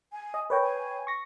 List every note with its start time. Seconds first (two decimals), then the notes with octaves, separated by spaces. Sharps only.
0.12 G#5
0.34 D#5
0.50 A#4 B4 C#5 G5
0.61 G#5
1.07 C#6 A#6